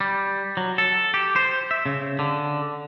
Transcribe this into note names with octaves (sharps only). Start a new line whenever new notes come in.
G3
F#3
A4
G4
C5
E5
C#3
D3